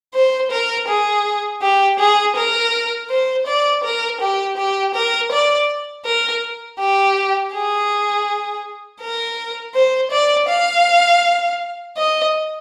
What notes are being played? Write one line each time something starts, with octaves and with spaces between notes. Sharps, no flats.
C5
A#4
G#4
G4
G#4
A#4
C5
D5
A#4
G4
G4
A#4
D5
A#4
G4
G#4
A#4
C5
D5
F5
D#5